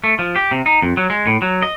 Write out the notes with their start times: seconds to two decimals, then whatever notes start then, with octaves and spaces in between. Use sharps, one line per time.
0.04 A3
0.19 F3
0.36 G4
0.51 C3
0.66 D#4
0.82 F2
0.97 F#3
1.10 G#3
1.27 A2
1.42 F#3
1.62 D#5